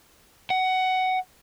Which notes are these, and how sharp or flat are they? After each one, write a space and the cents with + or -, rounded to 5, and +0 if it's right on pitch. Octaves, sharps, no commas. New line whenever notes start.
F#5 +15